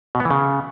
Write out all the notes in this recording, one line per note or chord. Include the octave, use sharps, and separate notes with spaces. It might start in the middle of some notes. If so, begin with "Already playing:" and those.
B2
B3
E3
C#3